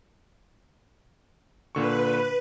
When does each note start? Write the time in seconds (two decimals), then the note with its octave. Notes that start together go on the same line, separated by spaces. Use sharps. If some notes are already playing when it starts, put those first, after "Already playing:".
1.75 A#2 D3 B4 C#6